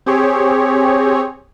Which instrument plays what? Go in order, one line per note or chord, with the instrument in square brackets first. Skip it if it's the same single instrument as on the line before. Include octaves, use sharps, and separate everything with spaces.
[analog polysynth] C4 G4 G#4 C#5